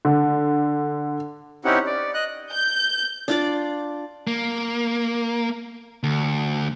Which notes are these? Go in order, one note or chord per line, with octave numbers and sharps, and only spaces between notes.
D3
C4 C#4 D#4 E4 G4 F#5
D5
D#5 F#6
G6
D4 F4 D5
A#3
D2